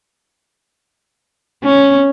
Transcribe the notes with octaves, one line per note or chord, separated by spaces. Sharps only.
C#4